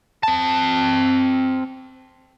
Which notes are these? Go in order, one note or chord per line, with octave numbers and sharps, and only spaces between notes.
C4 A5